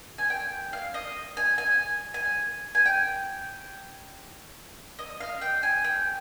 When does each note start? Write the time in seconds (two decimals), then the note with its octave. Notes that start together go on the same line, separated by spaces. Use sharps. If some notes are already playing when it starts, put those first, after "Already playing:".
0.18 G#5
0.30 G5
0.73 F5
0.94 D#5
1.37 G#5
1.58 G#5
2.14 G#5
2.75 G#5
2.86 G5
4.99 D#5
5.20 F5
5.41 G5
5.63 G#5
5.84 G5